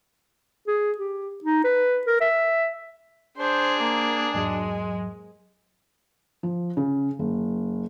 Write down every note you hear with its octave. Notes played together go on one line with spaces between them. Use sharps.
G#4
G4
D#4
B4
A#4
E5
D4 G#4 C5
A#3 A#5 D6 D#6
E2 G#2 F#3 G#3
F3
C#3
F#1